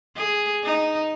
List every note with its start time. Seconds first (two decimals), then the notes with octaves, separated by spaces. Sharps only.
0.16 G#4
0.64 D#4